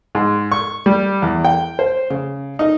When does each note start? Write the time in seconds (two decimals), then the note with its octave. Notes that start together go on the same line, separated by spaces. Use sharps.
0.15 G#2
0.52 C#6
0.86 G3
1.22 E2
1.45 G5
1.79 C5
2.10 C#3
2.59 D#4